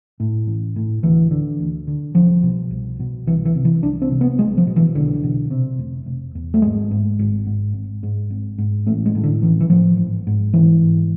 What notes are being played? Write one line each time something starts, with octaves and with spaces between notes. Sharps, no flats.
A2
A1
A2
D2 E3
D3
D2
D3
C2 F3
B2
C2
B2
C2 E3
E3
C3
E3
C2 D4
C4
C3
B3
B1 G#3
F3
B2
E3
B1 D3
B2
C3
F1
F1
E2
A3
G#1 G#3
G#2
G#1
G#2
G#1
G#2
G#1
G#2
A1 A3
G#3
A2
D3
A1 E3
E3
A2 F3
G#1
G#2
G#1 E3
G#2